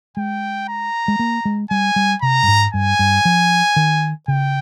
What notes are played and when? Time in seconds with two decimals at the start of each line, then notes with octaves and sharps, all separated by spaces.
0.17 G#3 G5
0.69 A#5
1.08 G#3
1.19 A#3
1.45 G#3
1.70 G3 G#5
1.96 G3
2.22 C3 A#5
2.43 G2
2.48 G#2
2.74 G2 G#5
2.99 G2
3.25 F3
3.76 D#3
4.28 C#3 G5